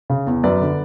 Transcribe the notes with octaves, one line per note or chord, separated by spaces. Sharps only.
C#3
E2
F#2 B4 D5
D3